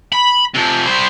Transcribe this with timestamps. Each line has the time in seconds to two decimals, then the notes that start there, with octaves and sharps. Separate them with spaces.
0.13 B5
0.54 C3 F3
0.85 G3 C5